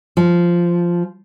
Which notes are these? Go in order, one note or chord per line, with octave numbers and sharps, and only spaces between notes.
F3